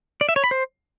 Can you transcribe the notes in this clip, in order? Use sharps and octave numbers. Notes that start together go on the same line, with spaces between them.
D5
E5
C#5
B5
C5